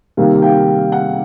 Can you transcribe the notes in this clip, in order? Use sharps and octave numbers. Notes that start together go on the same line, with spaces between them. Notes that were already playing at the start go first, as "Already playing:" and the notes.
C3 D#3 G3 A#3 F5
F5 G5
F#5